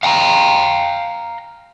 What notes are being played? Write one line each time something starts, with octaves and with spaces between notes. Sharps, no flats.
F5 G5 G#5 A#5